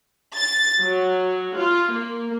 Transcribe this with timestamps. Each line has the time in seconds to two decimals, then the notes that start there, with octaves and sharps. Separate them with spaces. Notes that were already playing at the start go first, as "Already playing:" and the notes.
0.36 A6
0.82 F#3
1.57 F4
1.92 A#3